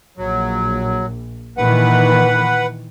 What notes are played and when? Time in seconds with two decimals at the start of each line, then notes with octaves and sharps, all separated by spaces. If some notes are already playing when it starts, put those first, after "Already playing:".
0.17 A#1 F#3
1.57 A#2 D#3 E3 B4 F#5